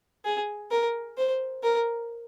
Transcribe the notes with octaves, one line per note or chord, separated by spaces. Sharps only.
G#4
A#4
C5
A#4